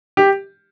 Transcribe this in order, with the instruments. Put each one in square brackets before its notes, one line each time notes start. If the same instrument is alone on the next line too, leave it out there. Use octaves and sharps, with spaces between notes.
[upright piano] G4